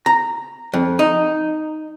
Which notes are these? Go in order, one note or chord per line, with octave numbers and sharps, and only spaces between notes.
A#5
F2
D#4